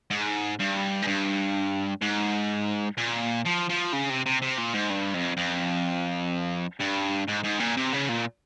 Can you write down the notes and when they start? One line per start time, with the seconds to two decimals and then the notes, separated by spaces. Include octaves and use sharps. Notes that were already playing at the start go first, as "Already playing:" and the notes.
0.11 G#2
0.59 G2
1.02 G#2
1.07 G2
2.02 G#2
2.98 A#2
3.45 F3
3.69 F3
3.93 C#3
4.10 C3
4.26 C3
4.42 C3
4.58 A#2
4.73 G#2
4.90 G2
5.14 F2
5.37 F2
6.80 G2
7.28 G#2
7.44 G#2
7.60 A#2
7.77 C3
7.93 C#3
8.09 A#2